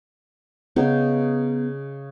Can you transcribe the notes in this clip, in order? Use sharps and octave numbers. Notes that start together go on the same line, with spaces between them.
C#3 B3 D#4